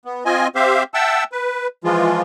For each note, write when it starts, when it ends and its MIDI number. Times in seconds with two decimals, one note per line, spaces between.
0.05 0.24 59
0.25 0.48 60
0.25 0.48 65
0.25 0.48 75
0.25 0.48 80
0.55 0.83 60
0.55 0.83 67
0.55 0.83 72
0.55 0.83 76
0.55 0.83 77
0.94 1.24 76
0.94 1.24 78
0.94 1.24 79
0.94 1.24 81
0.94 1.24 88
1.32 1.67 71
1.84 2.22 52
1.84 2.22 53
1.84 2.22 56
1.84 2.22 65